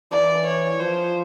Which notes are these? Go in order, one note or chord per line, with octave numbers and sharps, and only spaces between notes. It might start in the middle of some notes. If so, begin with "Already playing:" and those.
E3 D5
C#5
F3 C5